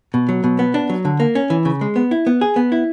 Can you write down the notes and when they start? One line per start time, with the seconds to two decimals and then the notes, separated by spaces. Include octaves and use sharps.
0.14 B2
0.29 F#3
0.44 B2
0.59 B3
0.74 D4
0.90 F#3
1.05 D3
1.20 A#3
1.35 C#4
1.50 E3
1.65 C#3
1.81 G#3
1.96 B3
2.11 E4
2.27 B3
2.41 G#4
2.56 B3
2.72 E4